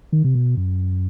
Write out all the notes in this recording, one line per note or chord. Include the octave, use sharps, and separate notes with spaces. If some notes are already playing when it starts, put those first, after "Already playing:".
D#3
C3
B2
F#2